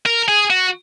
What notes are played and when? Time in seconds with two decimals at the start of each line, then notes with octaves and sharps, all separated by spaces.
0.06 A#4
0.28 G#4
0.51 F#4